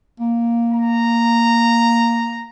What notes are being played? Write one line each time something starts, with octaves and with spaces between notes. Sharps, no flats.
A#3
A#5